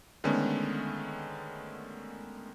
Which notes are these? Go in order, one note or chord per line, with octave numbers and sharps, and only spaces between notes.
D3 D#3 G#3 A3 B3 C#4